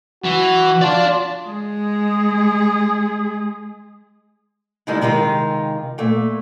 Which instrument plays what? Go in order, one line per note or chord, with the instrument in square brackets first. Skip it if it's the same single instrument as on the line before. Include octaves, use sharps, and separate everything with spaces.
[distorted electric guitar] E3 [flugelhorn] F#4
[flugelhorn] F4 [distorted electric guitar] D5 A5
[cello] G#3 G#4
[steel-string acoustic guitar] D3 D#3 G3 G#3 D#4 E4
C3 D#3 G#3 F4
A#2 A3